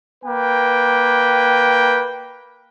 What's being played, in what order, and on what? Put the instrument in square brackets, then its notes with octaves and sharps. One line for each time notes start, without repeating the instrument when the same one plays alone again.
[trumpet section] A#3 B4 G5